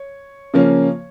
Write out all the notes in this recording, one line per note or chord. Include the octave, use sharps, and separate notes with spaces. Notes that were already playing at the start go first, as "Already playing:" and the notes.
Already playing: C#5
C#3 F3 A#3 C#4